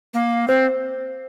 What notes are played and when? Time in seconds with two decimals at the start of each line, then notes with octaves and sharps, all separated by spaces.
0.14 A#3
0.48 C4 C5